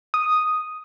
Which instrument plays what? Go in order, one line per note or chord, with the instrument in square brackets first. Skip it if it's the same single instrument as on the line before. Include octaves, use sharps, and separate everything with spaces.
[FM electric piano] D#6